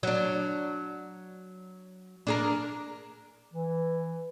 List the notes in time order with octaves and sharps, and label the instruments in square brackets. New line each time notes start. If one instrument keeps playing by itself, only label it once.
[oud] F#3 D4
D4 G#4 A#4
[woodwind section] E3